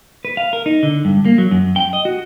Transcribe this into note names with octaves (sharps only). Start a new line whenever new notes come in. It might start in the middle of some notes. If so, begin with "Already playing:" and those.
B4
F5
A#4
D#4
D3
G2
A#3
F#3
F#2
G5
D#5
F#4